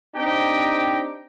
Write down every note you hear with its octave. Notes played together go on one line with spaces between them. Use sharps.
C4 D4 D#4 G4 G5